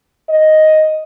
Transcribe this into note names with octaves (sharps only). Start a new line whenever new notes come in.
D#5